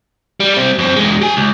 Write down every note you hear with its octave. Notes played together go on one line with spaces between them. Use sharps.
G3
G3 C4
F#2 C4
E2 G#3
G4 G#5
C#2